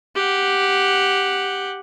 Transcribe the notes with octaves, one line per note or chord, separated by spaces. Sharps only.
G4 F#5